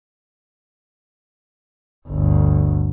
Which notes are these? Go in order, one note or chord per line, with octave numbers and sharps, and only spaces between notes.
G1 D2